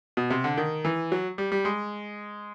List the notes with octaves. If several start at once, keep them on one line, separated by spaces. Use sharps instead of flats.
B2
C3
D3
D#3
E3
F#3
G3
G3
G#3